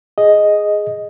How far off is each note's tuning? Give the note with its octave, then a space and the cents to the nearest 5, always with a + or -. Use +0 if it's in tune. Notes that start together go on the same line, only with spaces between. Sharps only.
G#4 +0 D#5 +0